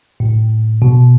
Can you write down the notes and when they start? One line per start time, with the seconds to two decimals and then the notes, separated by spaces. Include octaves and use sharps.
0.20 A2
0.82 B2